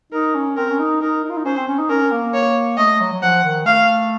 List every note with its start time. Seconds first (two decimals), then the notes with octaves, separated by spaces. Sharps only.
0.12 D#4 A#4
0.35 C#4
0.57 C4 A#4
0.70 C#4
0.80 D#4
1.01 D#4 A#4
1.24 D#4
1.30 F4
1.37 D#4
1.45 C#4 C5
1.57 C4
1.68 C#4
1.79 D#4
1.90 C#4 A#4
2.12 A#3
2.34 C#5
2.77 A3 D#5
3.01 F#3
3.13 F#3
3.22 F3 F#5
3.44 D#3
3.66 A3 F5